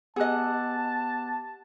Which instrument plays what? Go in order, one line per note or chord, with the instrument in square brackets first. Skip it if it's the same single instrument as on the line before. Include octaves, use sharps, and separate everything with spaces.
[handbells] B3 G4 F#6 [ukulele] G#4 D#5 [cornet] A5